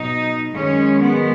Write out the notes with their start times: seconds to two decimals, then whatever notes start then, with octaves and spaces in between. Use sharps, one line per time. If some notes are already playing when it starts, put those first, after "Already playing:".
Already playing: B2 F#3 D#4
0.55 F#2 D#3 G#3 C#4
1.02 B3